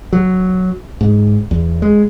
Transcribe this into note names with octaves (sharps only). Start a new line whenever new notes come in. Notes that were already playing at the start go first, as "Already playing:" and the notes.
F#3
G#2
E2
G#3